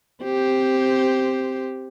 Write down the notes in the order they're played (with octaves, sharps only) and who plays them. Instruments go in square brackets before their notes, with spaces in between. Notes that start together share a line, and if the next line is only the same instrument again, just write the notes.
[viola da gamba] C4 G4 C5